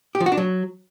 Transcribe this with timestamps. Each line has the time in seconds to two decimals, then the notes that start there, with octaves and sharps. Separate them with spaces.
0.15 G4
0.20 F3
0.26 F#4
0.32 D4
0.37 F#3